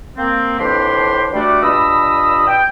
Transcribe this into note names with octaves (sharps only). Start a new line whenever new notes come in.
A#3 C4
F2 A2 E3 D4 G4 C6
G3 A3 D4 F#4 D5
G2 A#2 D#5 B5 D#6 E6
G5